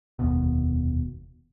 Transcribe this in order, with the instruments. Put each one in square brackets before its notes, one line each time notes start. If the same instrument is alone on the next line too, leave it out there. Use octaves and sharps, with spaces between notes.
[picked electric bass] F1 D#2 B2